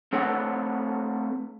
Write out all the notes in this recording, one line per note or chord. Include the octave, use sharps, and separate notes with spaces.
A3 C4 A4 B4 C#5 F#5